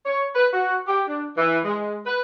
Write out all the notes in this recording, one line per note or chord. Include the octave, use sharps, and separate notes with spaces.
C#5
B4
F#4
G4
D4
E3
G#3
B4